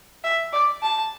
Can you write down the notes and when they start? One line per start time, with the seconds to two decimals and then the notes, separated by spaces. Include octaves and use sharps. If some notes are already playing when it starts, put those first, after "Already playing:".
0.24 E5
0.53 D5
0.83 A5